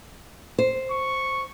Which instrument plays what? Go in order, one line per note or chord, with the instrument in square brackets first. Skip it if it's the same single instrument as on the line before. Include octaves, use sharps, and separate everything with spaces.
[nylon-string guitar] C5
[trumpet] C#6